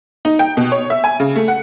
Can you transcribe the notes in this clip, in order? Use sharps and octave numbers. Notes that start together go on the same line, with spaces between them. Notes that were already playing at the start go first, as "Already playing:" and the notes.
D#4
G5
B2
C#5
E5
G#5
C#3
A3
F#5